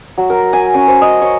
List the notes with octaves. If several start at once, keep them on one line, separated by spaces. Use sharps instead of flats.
F#3
A#4
G#5
C#4
C5
D#5
C#5